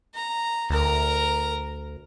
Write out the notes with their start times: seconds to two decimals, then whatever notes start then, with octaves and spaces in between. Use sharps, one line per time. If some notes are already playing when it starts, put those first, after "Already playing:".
0.15 A#5
0.70 D2 A#4 A#5